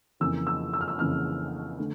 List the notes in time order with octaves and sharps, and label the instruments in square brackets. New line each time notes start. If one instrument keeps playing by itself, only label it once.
[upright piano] F2 C#3 E3 A#3 E6
E6
E6
F6
E6
F2 C#3 E3 A#3 F6
D3 A3